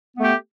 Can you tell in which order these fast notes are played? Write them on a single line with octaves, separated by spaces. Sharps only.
B3 A3 G4